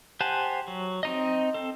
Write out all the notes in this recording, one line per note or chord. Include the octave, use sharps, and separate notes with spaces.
G4 C5 F#5 G#5 A5
F#3
C4 D#4 D#5
C4 A4